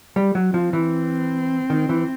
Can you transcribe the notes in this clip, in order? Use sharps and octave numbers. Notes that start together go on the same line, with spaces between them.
G3
F#3
F3 C4
E3
D#3
E3